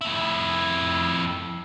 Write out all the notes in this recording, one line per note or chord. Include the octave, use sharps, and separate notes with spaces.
F2 E4